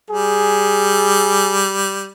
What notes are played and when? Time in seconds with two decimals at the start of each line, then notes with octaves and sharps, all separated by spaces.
0.10 G3 G#4